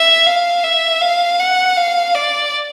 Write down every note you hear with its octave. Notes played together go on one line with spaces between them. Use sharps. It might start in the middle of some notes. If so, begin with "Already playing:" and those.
Already playing: E5
F5
E5
F5
F#5
F5
D5